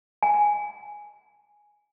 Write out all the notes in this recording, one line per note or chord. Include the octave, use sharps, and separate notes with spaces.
G#5